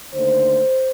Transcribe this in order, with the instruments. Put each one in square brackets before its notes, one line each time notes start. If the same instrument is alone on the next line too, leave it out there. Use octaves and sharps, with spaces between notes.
[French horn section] D#2 D3 A3 C5